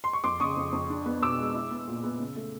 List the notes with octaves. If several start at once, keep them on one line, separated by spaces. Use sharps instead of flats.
C6
C#6
F2 C6 D6
C#3 C#6 D#6
F2
F2
D4
B3
B2 D6 E6
G#3
E4
B3
A#2
B3
C#3
A3